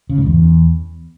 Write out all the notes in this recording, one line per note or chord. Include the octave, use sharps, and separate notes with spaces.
C#3
G#2
E2